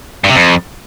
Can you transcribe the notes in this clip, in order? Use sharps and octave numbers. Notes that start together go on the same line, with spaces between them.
G2
C3
F2